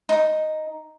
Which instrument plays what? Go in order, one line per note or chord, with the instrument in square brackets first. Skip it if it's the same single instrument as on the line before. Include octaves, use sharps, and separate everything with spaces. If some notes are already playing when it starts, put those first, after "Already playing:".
[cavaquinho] D#4 D#6